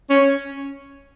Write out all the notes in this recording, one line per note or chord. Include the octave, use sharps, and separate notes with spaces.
C#4